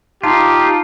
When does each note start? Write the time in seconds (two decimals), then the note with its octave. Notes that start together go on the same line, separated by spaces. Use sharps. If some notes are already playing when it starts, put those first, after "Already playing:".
0.24 D#4 F4 G4 A5